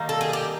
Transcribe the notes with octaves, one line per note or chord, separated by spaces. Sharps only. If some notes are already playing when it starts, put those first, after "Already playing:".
Already playing: D#3 G3 A#3
A4
G#4
G4